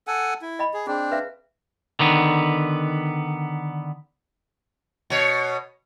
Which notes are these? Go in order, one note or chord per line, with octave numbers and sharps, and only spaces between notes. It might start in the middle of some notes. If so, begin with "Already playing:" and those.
A4 F#5 G#5
E4
D#5 G5 B5
G#4
C4 D4 G#4
B4 E5 F5
D3 D#3 B3
B2 C#5